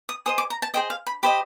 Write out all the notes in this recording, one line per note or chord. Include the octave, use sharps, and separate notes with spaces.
D#6
G#4 C5 D#5 D#6
D6
A#5
A5
G#4 C5 D#5 G5
F5
B5
G4 C5 D#5 B5